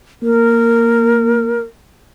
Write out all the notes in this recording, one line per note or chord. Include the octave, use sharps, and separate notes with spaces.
A#3 A#4